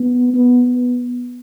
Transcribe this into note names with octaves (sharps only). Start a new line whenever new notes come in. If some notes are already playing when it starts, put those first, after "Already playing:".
Already playing: B3
B3